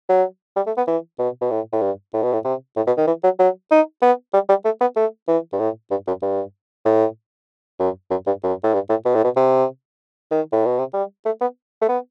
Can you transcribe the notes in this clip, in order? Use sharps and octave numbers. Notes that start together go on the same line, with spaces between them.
F#3
G3
A3
B3
E3
B2
B2
A2
A2
G2
A2
B2
A2
C3
A2
B2
D#3
E3
F#3
F#3
D#4
B3
G3
G3
A3
B3
A3
E3
G2
A2
G2
F#2
G2
A2
F#2
F#2
G2
F#2
A2
G2
A2
B2
A2
B2
C3
D#3
A2
B2
C3
G3
A3
B3
A3
B3